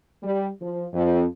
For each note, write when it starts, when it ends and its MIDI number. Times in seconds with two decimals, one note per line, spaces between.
0.23 0.48 55
0.61 0.86 53
0.93 1.24 41